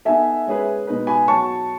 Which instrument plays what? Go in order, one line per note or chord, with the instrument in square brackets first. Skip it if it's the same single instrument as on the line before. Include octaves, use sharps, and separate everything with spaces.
[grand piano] B3 D#4 A4 [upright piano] E5 G#5
[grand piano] G#3 C#4 G#4 B4
B2 G#3 D#4 G#4 B4
[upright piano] G#5 B5
[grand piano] F#3 B3 F#4 C#5 [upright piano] A5 C#6